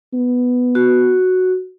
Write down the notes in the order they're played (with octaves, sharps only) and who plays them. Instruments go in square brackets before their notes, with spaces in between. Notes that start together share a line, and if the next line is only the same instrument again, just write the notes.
[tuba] B3
[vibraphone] F#4